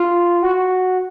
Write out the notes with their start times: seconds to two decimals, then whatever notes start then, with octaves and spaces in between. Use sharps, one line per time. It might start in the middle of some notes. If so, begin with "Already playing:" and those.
Already playing: F4
0.43 F#4